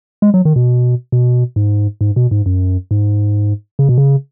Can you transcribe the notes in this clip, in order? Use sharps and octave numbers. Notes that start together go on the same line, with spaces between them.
G#3
F#3
D#3
B2
B2
G#2
G#2
B2
G#2
F#2
G#2
C#3
B2
C#3